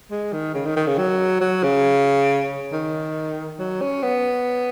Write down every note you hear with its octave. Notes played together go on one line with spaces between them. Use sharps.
G#3
D#3
C#3
D#3
D#3
C#3
F#3
F#3
C#3
D#3
F#3
C#4
B3